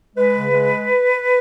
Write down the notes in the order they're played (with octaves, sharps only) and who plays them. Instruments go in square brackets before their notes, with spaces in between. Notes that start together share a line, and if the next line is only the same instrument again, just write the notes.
[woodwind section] G#3 B4
C#3
G#3